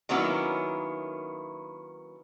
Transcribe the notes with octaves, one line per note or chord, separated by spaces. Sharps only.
D#3 F#3 A#3 B3 C#4 E4